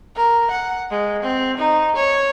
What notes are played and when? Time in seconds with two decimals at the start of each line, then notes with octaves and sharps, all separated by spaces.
0.16 A#4
0.51 F#5
0.91 G#3
1.22 C4
1.57 D#4
1.96 C#5